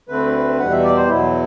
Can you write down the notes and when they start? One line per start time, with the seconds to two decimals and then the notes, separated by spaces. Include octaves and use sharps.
0.09 D2 D3 A3 C4 B4
0.59 E2 B2 G3 F#5
0.71 E5
0.84 D5
0.96 C5
1.09 E2 B2 F#3 E4